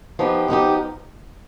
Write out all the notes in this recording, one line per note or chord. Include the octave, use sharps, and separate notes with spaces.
F3 B3 D#4 G4
F3 B3 D#4 G4